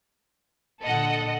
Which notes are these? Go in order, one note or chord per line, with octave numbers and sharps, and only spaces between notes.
A#2 D3 A4 D#5 F#5